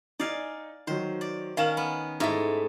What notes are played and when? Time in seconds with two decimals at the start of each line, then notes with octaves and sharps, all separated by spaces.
0.20 D#4 D5 F5 G#5
0.87 D#3 F#3 C5
1.21 D5
1.57 D#3 C#4 F5 E7 F#7
1.77 B3
2.20 G#2 A3 D#4 E4 E5